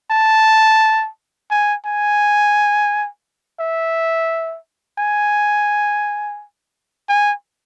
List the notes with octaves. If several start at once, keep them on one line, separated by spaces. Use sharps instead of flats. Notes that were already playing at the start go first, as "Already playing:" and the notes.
A5
G#5
G#5
E5
G#5
G#5